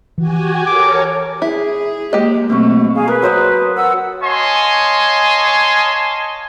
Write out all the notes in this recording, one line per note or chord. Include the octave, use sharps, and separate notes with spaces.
E3 F#4 G4 G#5
A4 A#4 C#5 D6
E4 G#4
G#3 A#3 G4 D#5
B2 F#3 A3 A#3 C4 C#6
G#4 F5
A#4 B4
F#3 C5 D#5
F#5 E6
C#5 D#5 F5 G#5 A5 C6